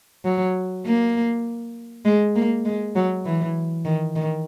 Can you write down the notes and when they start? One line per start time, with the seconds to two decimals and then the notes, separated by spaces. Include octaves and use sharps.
0.25 F#3
0.85 A#3
2.05 G#3
2.36 A#3
2.65 G#3
2.95 F#3
3.25 E3
3.85 D#3
4.16 D#3